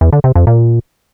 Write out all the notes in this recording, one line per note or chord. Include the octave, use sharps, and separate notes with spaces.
E2
D3
C3
F2
A#2